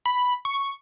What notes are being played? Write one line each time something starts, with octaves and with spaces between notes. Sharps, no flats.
B5
C#6